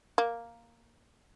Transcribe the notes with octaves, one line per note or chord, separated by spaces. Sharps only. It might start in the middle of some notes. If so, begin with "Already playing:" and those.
A#3